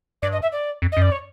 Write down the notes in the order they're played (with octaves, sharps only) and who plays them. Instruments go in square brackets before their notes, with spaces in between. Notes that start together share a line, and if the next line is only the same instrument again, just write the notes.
[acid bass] G2 [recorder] D5
[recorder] D#5
E5
D5
[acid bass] F2
[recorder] D#5
[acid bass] F#2 [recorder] D5
[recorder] C#5